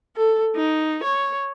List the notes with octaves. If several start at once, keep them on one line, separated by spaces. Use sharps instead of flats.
A4
D#4
C#5